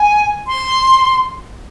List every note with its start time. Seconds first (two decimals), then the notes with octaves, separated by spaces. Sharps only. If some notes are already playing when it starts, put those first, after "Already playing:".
Already playing: G#5
0.47 C6